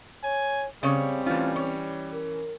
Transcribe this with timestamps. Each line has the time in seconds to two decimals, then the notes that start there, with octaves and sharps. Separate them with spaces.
0.24 C#5 G#5
0.83 C#3 G3 C4 C#5
1.26 E3 A3 C#4 F4
1.56 C#5
2.12 A#4